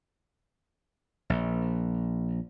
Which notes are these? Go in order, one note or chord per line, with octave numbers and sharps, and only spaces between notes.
A#1